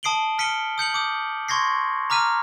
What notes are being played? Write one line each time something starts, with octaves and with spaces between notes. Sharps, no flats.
A5 D#6 C7 D7 F#7 G7
F6 B6 C#7 D#7 G7
D#6 G6 C#7 F#7
D6 D#6 G6
C6 C#6 G#6 A#6 C7
A#5 D6 F6 B6 D#7